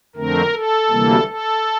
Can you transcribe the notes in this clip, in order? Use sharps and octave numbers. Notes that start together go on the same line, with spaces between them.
F2 D3 A3 C4 A#4
A4
D2 C3 E3 G3 A#3
A4